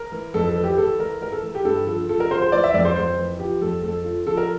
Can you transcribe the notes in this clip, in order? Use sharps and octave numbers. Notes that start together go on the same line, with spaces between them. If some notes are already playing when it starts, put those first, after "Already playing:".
Already playing: A#4
E3
F2 A4
A4
E3
G4
E3 A4
E3 A#4
E3 A#4
A4
E3
G4
G2 A4
F3 A4
F3 A4
A#4
F3 C5
C5
E3 D5
E5
F2 D5
C5
F2 C5
E3
F3 G4
F2 A4
F2 A4
F3
F3 A4
A#4